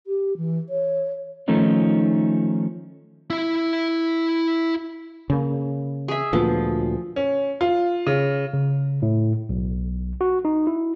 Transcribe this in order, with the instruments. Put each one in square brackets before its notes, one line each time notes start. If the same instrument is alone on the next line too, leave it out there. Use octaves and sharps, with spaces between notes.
[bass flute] G4
E3
C#5
[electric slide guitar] D#3 F3 A3 C#4 D#4
[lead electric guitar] E4 E5
[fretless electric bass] C#3 A#3
[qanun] G#4 E5
[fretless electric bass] D2 A#2 B3 [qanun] F3
[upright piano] C#4
F4
C#3
[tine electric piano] C#3
A2
B1
F#4
D#4
E4